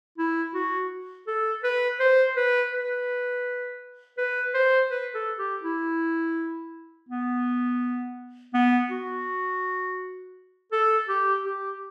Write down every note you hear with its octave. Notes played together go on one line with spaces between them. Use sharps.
E4
F#4
A4
B4
C5
B4
B4
B4
C5
B4
A4
G4
E4
B3
B3
F#4
A4
G4
G4